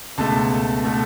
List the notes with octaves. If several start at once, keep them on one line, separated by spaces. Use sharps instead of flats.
C#2 B2 A3 A5
B2 A3